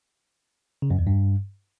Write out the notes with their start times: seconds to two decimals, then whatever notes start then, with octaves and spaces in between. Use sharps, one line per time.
0.82 C#3
0.90 F#2
0.99 E2
1.07 G2